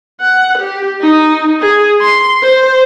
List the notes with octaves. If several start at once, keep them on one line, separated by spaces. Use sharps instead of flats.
F#5
G4
D#4
G#4
C6
C5